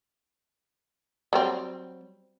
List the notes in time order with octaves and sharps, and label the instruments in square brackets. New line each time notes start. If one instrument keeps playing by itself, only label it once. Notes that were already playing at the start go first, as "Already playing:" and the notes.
[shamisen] F#3 G3 C4